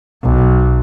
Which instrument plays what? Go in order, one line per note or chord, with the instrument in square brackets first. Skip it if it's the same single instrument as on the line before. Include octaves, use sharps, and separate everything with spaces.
[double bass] B1